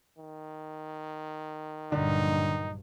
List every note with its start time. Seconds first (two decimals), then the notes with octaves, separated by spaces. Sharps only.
0.18 D#3
1.92 A#1 G2 D3 F#3 D#4